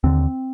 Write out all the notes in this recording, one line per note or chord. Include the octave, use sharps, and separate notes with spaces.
D#2 D3 C4